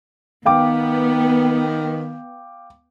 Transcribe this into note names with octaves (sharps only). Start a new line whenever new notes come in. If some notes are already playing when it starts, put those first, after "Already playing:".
D#3 B3 F5 G5 D6